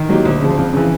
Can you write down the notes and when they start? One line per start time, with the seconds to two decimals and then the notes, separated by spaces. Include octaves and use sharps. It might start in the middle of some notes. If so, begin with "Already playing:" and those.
Already playing: D#3
0.09 F#3 A#3 D#4 G4
0.25 D2
0.41 C#3 F3
0.57 F2
0.73 C#3 E3